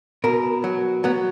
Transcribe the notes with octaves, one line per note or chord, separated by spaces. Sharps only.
B2 A#4
F#3
F#3 B3